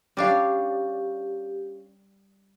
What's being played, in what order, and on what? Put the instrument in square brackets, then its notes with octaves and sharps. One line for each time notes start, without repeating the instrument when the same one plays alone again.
[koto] G3 D4 [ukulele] C#4 F5 [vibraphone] G4